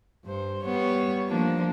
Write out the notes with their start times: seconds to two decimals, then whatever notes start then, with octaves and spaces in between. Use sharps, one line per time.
0.25 G2 C5
0.63 G3 B3 C#5
1.28 F3 A#3 D4